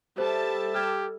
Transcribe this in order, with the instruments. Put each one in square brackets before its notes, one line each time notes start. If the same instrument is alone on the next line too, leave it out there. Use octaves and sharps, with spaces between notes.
[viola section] G3 E5 A5 [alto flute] A4 [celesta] C5
[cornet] G4 [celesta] F6 G#6